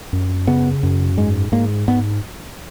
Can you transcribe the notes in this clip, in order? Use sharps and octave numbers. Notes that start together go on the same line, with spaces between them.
F#2
C#3 B3
F#2
G#2 G#3
G#2 A#3
G#2 B3